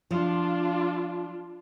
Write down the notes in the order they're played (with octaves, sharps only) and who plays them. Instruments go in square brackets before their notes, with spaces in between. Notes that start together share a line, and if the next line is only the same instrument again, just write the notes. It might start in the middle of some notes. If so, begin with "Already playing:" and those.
[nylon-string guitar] F3 [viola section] D4 F4